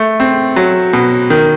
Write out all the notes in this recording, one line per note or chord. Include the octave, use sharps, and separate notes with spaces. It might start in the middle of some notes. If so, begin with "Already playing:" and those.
Already playing: A3
C4
F#3
B2
D#3